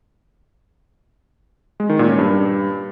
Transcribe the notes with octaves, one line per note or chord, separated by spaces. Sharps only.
G#3
D#3
A#2
C#4
G2